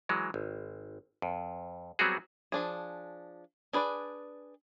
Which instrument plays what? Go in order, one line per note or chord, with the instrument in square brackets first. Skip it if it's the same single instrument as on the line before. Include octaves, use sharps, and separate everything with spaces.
[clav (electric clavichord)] E3 F#3 G#3
G#1
F2
F#3 G3 B3 C4 F#4 G#4
[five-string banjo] F3 D4 G#4
D4 G#4 B4 C5 D5